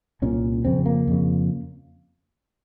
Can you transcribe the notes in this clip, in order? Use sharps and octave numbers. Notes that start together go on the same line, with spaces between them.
C2 A#2 C#4
F2 C#3 C4
A#3
F2 C#3